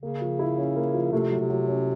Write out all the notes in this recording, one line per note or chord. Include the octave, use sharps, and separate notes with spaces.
C#3 A#3
F3
E4
C#4
A#3
F3
C3 A3
F#3
C3
F#3
C#4